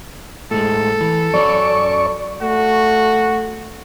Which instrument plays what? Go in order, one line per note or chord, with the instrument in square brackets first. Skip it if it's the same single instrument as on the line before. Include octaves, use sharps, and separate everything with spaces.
[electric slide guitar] A2 G#3 [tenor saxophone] A4
[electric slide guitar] E3
[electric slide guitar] F#2 F#3 C#5 [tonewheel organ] D5 C#6
[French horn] A3 [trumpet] F#4